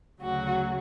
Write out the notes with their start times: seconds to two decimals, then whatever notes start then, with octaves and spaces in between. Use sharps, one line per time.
0.22 D2 C#3 F#3 F#4